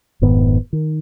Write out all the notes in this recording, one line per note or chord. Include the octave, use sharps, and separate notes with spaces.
F1 G#2 D#3 B3
D#3